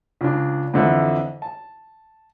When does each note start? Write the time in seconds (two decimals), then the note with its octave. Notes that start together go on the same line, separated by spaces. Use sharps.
0.21 C#2 D4
0.74 F2 D3 E3
1.42 A5